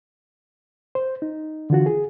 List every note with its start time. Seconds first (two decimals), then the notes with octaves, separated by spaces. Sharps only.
0.95 C5
1.22 D#4
1.70 D3 E3 F4 F#4
1.86 G#4